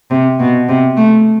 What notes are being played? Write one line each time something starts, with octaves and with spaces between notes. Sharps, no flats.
C3
B2
C3
A3